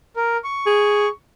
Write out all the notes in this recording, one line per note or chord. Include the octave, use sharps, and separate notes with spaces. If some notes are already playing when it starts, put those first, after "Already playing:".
A#4
C#6
G#4